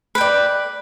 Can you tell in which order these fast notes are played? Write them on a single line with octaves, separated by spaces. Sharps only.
B4 G5 D5